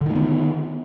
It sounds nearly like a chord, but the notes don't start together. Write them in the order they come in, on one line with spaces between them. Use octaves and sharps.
D3 D#3 A3 B3